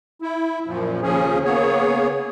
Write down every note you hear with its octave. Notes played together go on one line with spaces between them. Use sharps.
E4
F#2 A#2 F3
D#2 C#3 F3 C#4 G#4
C#3 A#3 B3 G#4 C#5